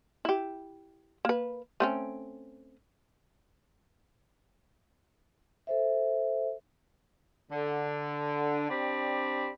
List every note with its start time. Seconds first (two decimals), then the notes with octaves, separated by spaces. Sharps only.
0.25 E4 G4
1.25 A#3 B4
1.80 A3 C4 C#4
5.67 A4 C5 E5
7.52 D3
8.70 C4 D4 G4 D5 B5